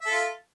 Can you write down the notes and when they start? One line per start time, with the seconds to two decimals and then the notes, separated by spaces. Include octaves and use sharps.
0.01 E5
0.06 A4
0.11 F4